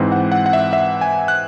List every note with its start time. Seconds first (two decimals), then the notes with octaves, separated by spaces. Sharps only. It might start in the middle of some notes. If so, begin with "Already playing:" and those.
Already playing: G#2 E3 C4
0.12 F#5
0.32 F#5
0.46 F#5
0.53 E5
0.73 E5
1.01 G#5
1.28 F#6